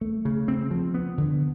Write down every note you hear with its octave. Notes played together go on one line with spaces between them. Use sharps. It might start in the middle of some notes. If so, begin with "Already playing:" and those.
A3
C#3
C4
F3
B3
D3